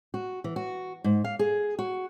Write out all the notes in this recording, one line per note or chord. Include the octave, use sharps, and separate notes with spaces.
F#4
E3
F#4
G#2
F5
G#4
F#4